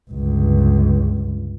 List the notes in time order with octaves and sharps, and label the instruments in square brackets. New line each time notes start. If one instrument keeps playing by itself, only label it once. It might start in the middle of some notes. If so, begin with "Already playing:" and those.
[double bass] G1 C#2